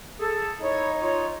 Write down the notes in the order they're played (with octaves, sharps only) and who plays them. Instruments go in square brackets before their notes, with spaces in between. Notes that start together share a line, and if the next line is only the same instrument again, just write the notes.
[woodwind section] G#4 A4
[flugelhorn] D#4 [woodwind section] E4 C#5
[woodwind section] F4 C#5